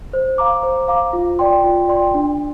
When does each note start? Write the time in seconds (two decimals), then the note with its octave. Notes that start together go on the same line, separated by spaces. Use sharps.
0.13 C5
0.38 F5 A#5 D6
0.63 C5
0.88 F5 A#5 D6
1.13 F4
1.39 D5 G5 C6
1.64 F4
1.89 D5 G5 C6
2.14 D4